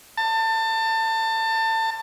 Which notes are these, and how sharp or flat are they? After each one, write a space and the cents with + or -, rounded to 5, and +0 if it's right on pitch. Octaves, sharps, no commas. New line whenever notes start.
A5 +25